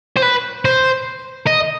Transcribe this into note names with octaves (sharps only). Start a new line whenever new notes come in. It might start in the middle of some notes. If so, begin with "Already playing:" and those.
C5
B4
C5
D#5